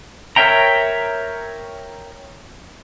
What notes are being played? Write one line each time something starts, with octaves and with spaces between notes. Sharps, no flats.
A#4 C#5 E5 G5 A#5